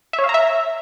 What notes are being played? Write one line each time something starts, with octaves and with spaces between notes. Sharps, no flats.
E5
C#5
F5
A#5
E5